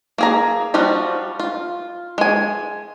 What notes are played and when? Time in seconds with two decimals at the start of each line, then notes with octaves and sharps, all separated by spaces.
0.18 A#3 G#4 A#5
0.74 F3 G3 F4 F#4
1.40 F4
2.18 G#3 G#5